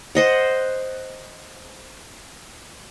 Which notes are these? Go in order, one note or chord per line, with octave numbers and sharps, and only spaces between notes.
C5 D#5 F#5